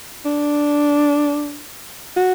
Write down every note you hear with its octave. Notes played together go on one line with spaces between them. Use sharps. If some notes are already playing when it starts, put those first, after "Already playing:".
D4
F#4